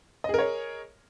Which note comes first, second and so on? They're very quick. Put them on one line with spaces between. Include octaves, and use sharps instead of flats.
D#5 G#4 A#4 C#5